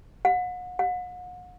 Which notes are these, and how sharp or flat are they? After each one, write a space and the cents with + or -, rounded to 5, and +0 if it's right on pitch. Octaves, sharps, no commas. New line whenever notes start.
F#5 -35
F#5 -40